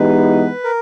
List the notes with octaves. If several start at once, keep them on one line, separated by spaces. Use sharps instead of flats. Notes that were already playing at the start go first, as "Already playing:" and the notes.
Already playing: E3 G#3 B3 D#4 G4 B4
A#4